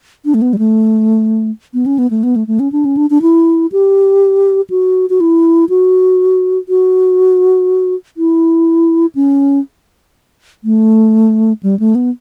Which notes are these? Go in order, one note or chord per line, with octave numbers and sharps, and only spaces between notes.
D4
A3
B3
G3
A3
B3
C#4
B3
A3
B3
A3
A3
C#4
D4
C#4
D4
D4
E4
G4
F#4
F#4
E4
F#4
F#4
E4
C#4
A3
G3
A3
B3